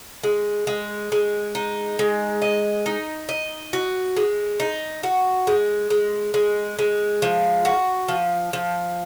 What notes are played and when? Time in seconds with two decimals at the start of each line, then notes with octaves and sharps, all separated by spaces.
0.23 G#3
0.67 G#3
1.12 G#3
1.55 D#4
1.99 G#3
2.42 D#5
2.86 D#4
3.29 D#5
3.73 F#4
4.16 G#3
4.60 D#4
5.03 F#4
5.47 G#3
5.90 G#3
6.34 G#3
6.79 G#3
7.22 F3
7.65 F#4
8.08 F3
8.53 F3